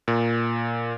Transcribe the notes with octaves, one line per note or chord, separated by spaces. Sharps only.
A#2